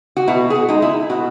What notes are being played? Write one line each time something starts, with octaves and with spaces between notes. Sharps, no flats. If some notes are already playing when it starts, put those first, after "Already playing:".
F#4
B2 E4
G#4
F#4
G#3 D#4
E4
B2 F#4